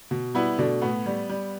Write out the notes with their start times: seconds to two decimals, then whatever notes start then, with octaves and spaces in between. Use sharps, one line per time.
0.11 B2
0.34 G3 B3 E4
0.58 B2 A3 D4
0.82 A2 B3
1.06 G3
1.30 G3